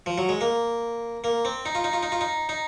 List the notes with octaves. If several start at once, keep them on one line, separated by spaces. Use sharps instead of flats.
F3
F#3
G#3
A#3
A#3
C4
D#4
F4
D#4
F4
D#4
F4
D#4
D#4